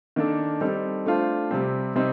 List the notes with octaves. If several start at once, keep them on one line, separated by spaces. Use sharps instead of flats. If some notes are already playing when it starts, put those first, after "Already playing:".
D#3 A#3 D4 A4
G3 C4 D#4 A4
A3 D4 F4 C5
C3 G3 C4
C3 G3 C4 D#4